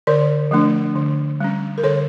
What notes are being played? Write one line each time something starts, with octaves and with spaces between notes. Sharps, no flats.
D3 A#4 D5
F3 A3 D4
D3
G3 C#4
A#4
D3 A4 C#5